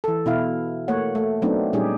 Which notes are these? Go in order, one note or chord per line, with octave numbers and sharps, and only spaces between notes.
E3 A4
B2 E4 F5
A3 A#3 C#5 F#5
A3
F#3 A3 B3 C4 D4 D#4
A#2 G3 C#4 D#4 G4 G#4